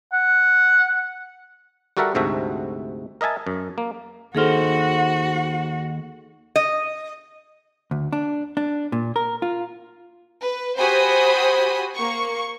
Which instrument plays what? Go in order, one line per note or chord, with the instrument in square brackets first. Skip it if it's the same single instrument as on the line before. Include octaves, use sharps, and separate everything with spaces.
[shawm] F#5
[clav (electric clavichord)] G3 F#4 A4 A#4 E5 F#5
D2 G#2 C3 A3 F#4 E5
A#4 D#5 E5 G#5 A5
F#2
A#3
[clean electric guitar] D#2 D#4 C5 [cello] F#4 F#5 [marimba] G#4 A4 F6
[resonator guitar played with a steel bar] D#5
[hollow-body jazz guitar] D2
D4
D4
A#2
A#4
F4
[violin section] B4
F#4 G4 C5 G#5 B5 D#6
A#3 C#6